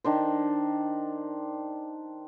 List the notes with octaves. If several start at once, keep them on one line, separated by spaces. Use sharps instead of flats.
D#3 D4 C5